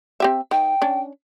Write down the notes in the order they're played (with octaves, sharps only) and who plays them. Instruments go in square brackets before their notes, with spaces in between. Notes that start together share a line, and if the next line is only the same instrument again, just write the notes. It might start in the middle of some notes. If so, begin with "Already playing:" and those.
[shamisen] C4 G4 E5
[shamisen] D#3 [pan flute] G5
[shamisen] C#4 D4